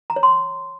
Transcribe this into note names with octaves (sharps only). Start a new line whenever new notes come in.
A#5
C#5
C6